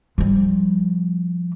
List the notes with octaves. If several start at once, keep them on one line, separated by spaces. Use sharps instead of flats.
F3 G3